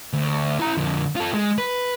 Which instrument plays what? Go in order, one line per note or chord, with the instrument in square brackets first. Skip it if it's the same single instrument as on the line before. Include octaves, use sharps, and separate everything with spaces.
[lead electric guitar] D2
E4 A#5
F2 D3
F4 A4
G#3
B4